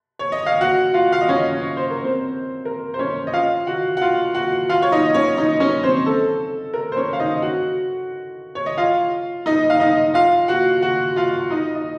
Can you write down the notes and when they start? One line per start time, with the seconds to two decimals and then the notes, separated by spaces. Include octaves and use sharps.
0.19 C#5
0.32 D#5
0.46 F5
0.61 F#4 F#5
0.94 F4 F5
1.12 F5
1.21 D#5
1.28 C#4 C#5
1.62 C#5
1.77 C5
1.91 A#4
2.04 C4 C5
2.65 A#4
2.94 C5
2.99 C#4 C#5
3.27 D#5
3.33 F4 F5
3.67 F#4 F#5
3.97 F#5
4.01 F4 F5
4.35 F#4 F#5
4.69 F4 F5
4.82 C#5
4.92 D#4 D#5
5.14 C#4 C#5
5.37 D#4 D#5
5.60 C#4 C#5
5.83 C4 C5
6.06 A4
6.74 A#4
6.92 C5
6.96 C#4 C#5
7.13 F5
7.20 D#4 D#5
7.42 F#4 F#5
8.55 C#5
8.66 D#5
8.78 F4 F5
9.46 D#4 D#5
9.70 F5
9.80 D#4 D#5
10.14 F4 F5
10.48 F#4 F#5
10.82 F#4 F#5
11.16 F4 F5
11.50 D#4 D#5
11.75 D#5